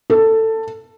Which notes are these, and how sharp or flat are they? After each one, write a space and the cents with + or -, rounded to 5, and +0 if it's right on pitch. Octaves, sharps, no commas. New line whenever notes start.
A4 +15